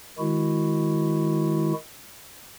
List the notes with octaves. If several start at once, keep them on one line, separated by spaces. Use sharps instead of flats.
D#3 G#3 E4 F#4